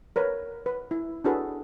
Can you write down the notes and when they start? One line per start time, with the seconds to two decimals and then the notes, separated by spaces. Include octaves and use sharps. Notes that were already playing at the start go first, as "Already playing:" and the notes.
0.16 A#4 B4 C#5
0.66 B4
0.91 E4
1.24 D4 E4 F#4 G#4 A4 B4